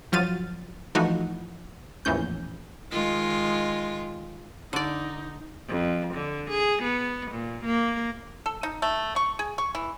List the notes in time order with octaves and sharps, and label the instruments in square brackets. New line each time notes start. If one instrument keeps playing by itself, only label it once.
[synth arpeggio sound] G1 F3 F#3 F6 A6 D#7
E3 F3 A3 D#4 F#4
A#1 E2 A2 C#4 G6
[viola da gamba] D#3 G#3 F4
[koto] D3 D5 [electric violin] D#4
[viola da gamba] F2
D3
G#4
B3
A#2
A#3
[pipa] A4
D#4
A3
C#6
G#4
C#6
E3